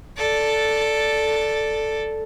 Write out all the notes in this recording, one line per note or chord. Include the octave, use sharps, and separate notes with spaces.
A4 D5